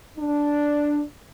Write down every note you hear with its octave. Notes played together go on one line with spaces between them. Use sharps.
D4